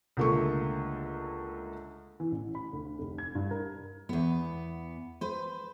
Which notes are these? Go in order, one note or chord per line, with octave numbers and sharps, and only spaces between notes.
C#2 D3 A3 A#3 C#6
E3
A1
B5
D2
F1
G#6
G2
A#4
E2 B3
B4 C5